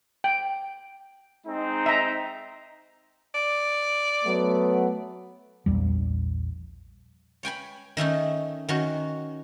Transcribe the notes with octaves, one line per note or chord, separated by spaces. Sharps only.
G5
G#3 C4 D#4
E5 A#5
D5
F#3 A3 B3
A#1 E2 G3
C#5 G5 G#5 B5
D#3 A3 C#4 D#4
D#3 C#4 F#4